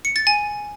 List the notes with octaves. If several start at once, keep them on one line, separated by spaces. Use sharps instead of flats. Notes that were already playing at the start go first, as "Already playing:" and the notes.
C#7
A6
G#5